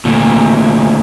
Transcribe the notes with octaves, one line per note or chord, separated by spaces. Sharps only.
D2 A#2